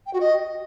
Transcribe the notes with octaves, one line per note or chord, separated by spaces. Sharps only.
G5
F#4
D#5